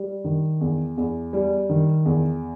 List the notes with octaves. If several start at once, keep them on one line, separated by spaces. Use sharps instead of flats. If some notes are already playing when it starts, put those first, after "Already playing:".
Already playing: G3
D#3
E2
E2
G3
D#3
E2